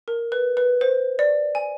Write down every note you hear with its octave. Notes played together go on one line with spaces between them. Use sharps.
A#4
B4
B4
C5
D5
G#5